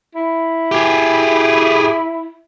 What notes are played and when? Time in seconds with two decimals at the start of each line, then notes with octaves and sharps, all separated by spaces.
0.15 E4
0.72 G4 G#4